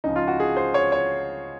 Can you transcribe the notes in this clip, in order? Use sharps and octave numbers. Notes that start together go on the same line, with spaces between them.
C#2 C#3 F3 D#4
F4
F#4
G#4
C5
C#5
C#5